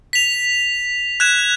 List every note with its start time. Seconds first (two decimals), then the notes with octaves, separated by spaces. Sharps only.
0.13 B6 F7
1.20 F#6 G#6 E7